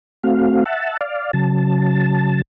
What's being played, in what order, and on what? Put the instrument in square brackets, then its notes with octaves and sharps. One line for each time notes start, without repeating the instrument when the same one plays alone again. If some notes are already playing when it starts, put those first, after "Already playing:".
[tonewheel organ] A3 C4 F#4 F5
E5 F#5 A5
D5 F5
C#3 F#3 A5